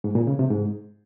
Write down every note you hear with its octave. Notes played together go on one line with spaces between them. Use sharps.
G#2
A#2
C#3
C3
G#2